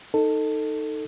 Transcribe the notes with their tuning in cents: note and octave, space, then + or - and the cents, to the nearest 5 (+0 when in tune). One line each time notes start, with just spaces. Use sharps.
D#4 +0 A4 +15